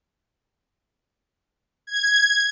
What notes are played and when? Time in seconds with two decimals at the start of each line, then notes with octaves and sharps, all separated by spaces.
1.87 G#6